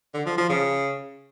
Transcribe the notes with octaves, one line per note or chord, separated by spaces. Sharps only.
D3
F3
F3
C#3